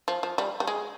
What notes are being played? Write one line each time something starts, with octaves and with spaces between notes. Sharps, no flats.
F3
F3
G3
G3
G#3